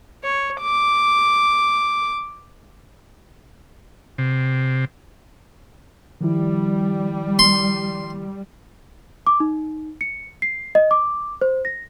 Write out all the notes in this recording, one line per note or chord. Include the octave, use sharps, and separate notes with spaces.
C#5
D6
C3
D#3 F3 G3 E4
C6
D6
D#4
C#7
C7
D#5
D6
C5
A#6